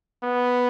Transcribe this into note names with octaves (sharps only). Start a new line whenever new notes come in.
B3